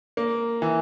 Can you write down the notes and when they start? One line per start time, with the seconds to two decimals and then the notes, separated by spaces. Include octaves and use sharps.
0.17 A#3
0.62 E3